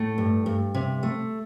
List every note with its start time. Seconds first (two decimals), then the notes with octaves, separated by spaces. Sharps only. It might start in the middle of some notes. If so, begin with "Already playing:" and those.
Already playing: A2 A3
0.18 G2
0.46 G2
0.75 C3
1.03 A3